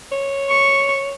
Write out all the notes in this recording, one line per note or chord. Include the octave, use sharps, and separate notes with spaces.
C#5
C#6